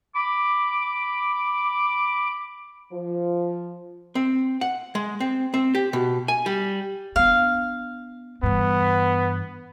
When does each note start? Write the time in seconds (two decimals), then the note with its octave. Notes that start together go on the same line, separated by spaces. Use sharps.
0.14 B5 D6
2.92 F3
4.15 C4
4.61 F#5
4.95 G#3
5.20 C4
5.54 C4
5.75 G4
5.93 B2
6.28 G#5
6.46 G3
7.16 B3 D4 F5
8.43 G2 E3 B3